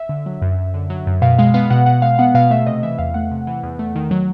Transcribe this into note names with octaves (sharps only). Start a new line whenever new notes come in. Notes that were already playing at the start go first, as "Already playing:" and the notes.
Already playing: E5
D3
F#3
F#2
F#2
D3
F#3
F#2
B2 F5
G#3 F5
B3 F5
B2 F#5
B2 F#5
G#3 F5
B3 F#5
B2 F5
A3 E5
C3 D#5
E3 E5
E2 F5
A3 F#5
C3
E3
E2
A3
D#3
F#3